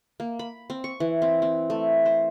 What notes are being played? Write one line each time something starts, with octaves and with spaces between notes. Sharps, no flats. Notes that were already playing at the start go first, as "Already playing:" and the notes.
A#3
B5
C4
C#6
E3
C4
C4
A3
C5